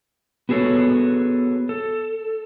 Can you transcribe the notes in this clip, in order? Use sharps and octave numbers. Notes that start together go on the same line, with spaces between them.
B3 F#4 G#4 A4 C#5
A4